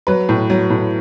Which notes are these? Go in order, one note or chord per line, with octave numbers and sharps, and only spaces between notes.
F#3 B4
A2
F#3
A2